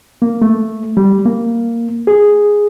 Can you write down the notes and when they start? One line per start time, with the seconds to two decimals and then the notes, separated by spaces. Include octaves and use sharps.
0.22 A#3
0.42 A3
0.97 G3
1.25 A#3
2.07 G#4